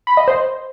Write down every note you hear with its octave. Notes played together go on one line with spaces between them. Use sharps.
B5
D#5
C5